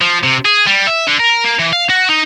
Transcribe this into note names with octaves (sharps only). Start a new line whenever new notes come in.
F3
C3
G#4
G3
E5
D3
A#4
A#3
E3
F5
F#4
D#4